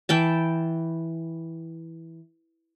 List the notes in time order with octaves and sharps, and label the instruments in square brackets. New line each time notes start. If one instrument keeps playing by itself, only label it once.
[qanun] E3 G5 A5